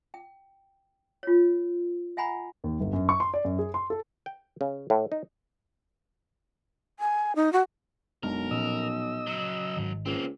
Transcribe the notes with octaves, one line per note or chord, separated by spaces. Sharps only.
G5
F4 C#5
E5 F#5 G#5 A#5 B5
D#2
G1
F#2
C#6
C6
D5
F#2
G#4
C6
A4
G5
C#3
A2
D#4
G#5
D#4
F#4
F#1 B1 G#3 D4 A#4
A#2 F3 C#4 D#5 E6
C#3 F#3
G#1 G#2 D#3
C#2 A#3 C4